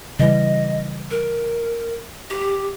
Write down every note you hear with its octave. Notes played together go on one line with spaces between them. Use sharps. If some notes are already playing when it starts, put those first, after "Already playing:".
C#3 E3 G3 D#5
A#4
G4